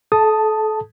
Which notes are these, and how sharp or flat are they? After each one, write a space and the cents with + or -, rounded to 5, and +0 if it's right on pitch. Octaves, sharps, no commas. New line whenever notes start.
A4 -30 A5 +0 D#6 +0